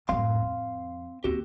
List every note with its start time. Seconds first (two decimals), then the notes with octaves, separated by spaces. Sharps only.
0.09 F#2 A2 C4 F5 C6
0.43 F2
1.24 D#2 C4 F#4 G4